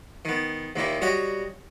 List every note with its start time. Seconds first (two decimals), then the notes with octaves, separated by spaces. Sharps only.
0.25 D#3 B3
0.76 D#2 A#2 D#3 E4 E5
1.01 G3 F#4 C#5 D#5 G5